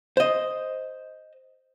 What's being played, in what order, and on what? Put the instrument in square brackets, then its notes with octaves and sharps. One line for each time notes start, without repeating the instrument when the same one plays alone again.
[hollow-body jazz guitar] C5 D#5